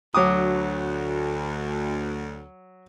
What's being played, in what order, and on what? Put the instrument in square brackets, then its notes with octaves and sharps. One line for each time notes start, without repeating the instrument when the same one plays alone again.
[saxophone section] D2 [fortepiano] F#3 D6 D#6